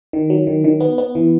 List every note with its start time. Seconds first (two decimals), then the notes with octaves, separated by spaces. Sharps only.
0.13 D#3
0.30 F#3
0.47 D#3
0.64 D#3
0.80 B3
0.98 B3
1.15 E3